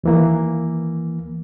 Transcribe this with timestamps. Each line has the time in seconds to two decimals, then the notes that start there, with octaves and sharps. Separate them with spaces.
0.04 D#2 E3 A#3